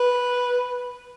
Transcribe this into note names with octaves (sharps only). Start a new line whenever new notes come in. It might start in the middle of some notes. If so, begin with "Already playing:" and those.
Already playing: B4